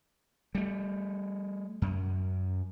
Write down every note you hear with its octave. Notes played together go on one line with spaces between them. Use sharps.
G3 A3
F#2